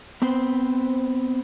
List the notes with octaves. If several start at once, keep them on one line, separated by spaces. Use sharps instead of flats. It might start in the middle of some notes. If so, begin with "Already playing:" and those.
B3 C4 C5